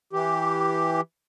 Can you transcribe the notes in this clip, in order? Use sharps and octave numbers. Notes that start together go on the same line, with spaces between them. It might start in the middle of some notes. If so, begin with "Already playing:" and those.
E3 G4